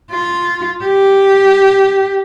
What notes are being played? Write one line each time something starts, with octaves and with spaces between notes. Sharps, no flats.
F4
G4